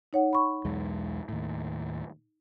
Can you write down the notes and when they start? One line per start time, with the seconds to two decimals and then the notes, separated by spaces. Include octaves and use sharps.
0.13 D#4 C#5 F#5
0.33 B5 C#6
0.65 B1 E2 G#3
1.29 D#2 A2